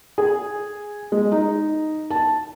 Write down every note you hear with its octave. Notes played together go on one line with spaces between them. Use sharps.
G#4
G#3
D#4
A5